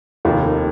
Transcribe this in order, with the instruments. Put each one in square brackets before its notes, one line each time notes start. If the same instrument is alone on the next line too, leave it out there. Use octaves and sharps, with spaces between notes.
[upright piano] F1 D#2 D#3 A#3 F4